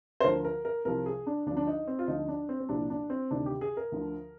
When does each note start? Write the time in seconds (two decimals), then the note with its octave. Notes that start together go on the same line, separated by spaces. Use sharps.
0.20 C5
0.24 D2 D3 F3 A#4
0.44 A#4
0.65 A#4
0.85 C2 C3 F3 A#4
1.06 G#4
1.27 D4
1.46 D2 D3 F3 D4
1.57 D4
1.67 D#4
1.87 C4
1.99 F4
2.08 D2 D3 F3 D#4
2.28 D4
2.49 C4
2.60 C4
2.69 C2 A#2 F3 D4
2.90 D4
3.10 C4
3.31 D2 C3 D#3 D4
3.46 G4
3.61 G#4
3.77 A#4
3.92 D2 D3 F3